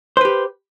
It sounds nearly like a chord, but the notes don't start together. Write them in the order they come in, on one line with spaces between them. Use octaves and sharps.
C5 B4 G4